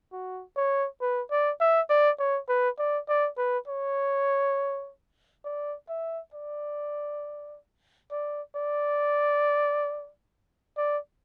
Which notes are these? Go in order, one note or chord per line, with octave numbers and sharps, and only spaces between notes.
F#4
C#5
B4
D5
E5
D5
C#5
B4
D5
D5
B4
C#5
D5
E5
D5
D5
D5
D5